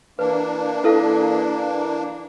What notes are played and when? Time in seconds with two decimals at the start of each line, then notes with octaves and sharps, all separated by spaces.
0.19 E3 A#3 D4 B4
0.84 E4 A4 F5